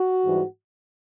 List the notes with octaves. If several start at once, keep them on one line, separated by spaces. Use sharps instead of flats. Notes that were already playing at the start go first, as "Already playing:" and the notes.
Already playing: F#4
G#2 E3 G3